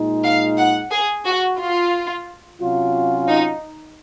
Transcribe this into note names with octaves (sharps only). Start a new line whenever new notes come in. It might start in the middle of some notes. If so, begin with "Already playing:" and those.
Already playing: A#2 G#3 D#4
F5
F#5
G#4
F#4
F4
C3 F#3 C#4 F4
D#4